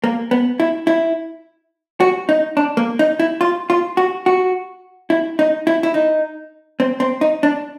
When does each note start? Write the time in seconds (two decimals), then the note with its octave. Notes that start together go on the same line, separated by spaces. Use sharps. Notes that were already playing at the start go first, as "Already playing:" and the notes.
0.04 A#3
0.31 B3
0.60 E4
0.87 E4
2.00 F#4
2.29 D#4
2.57 D4
2.77 A#3
2.99 D#4
3.20 E4
3.41 F4
3.70 F4
3.97 F#4
4.26 F#4
5.10 E4
5.39 D#4
5.67 E4
5.83 E4
5.94 D#4
6.80 C4
7.00 C4
7.21 D#4
7.43 D4